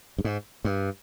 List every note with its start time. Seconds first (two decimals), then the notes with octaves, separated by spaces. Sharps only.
0.18 G2
0.24 G#2
0.65 G2